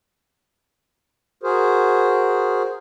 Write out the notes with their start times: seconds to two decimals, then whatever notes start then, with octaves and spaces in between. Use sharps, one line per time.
1.43 F#4 G#4 A#4 C5